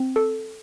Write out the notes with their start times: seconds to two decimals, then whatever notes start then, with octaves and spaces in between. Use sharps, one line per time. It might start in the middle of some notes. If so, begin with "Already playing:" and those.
Already playing: C4
0.16 A4